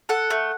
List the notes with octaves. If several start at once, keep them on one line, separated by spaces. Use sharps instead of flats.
A4 F#5
A3